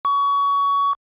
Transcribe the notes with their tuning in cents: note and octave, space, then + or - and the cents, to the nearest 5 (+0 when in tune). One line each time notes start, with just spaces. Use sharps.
C#6 +25